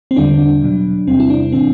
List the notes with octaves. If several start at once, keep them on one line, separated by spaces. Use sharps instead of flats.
C4
E2 D3 G3 D4
B2 F#3
E2 C3 G3 C4
E4
D4
A2 E3 G3 C4